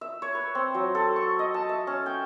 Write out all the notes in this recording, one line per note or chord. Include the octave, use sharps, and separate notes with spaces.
E5
C#5
B4
C4
F#3
A4
C#6
D#5
A5
E5
C#4
G5